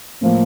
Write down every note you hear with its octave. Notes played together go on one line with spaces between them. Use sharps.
A2 F3 A#3